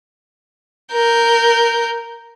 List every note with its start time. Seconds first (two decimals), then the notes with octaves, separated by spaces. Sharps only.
0.92 A#4 G6